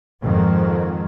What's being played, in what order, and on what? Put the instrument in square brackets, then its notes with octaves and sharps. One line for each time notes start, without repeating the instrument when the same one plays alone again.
[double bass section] F2 G#2 D#3